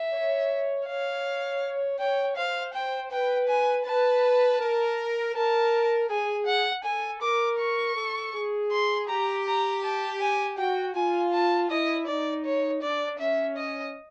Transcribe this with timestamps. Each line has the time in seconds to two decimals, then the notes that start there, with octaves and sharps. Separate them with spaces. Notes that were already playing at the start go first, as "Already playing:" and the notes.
Already playing: E5
0.12 C#5
0.86 C#5 F5
1.99 C#5 G5
2.37 C5 F5
2.73 G5
3.11 B4 G5
3.48 G#5
3.85 B4 A5
4.60 A#4
5.34 A#4 A5
6.09 G#4 G#5
6.46 F#5
6.84 A4 G#5
7.22 A#4 D6
7.59 C#6
7.96 A4
8.34 G#4
8.71 C6
9.08 G4 A#5
9.46 A#5
9.83 A5
10.20 G#5
10.58 F#4 G5
10.95 F4 G#5
11.32 A5
11.69 E4 D#5
12.07 D#4 D5
12.44 C#5
12.82 D4 D5
13.19 C#4 E5
13.57 D#5